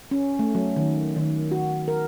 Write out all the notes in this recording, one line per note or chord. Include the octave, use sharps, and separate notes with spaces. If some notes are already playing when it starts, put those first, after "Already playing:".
C#4
A3
F#3
D#3
D#3
F#4
A#4